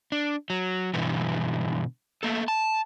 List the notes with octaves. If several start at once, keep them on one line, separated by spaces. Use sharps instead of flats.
D4
F#3
G2 B2 D3 E3
A3 A#3 A4
A5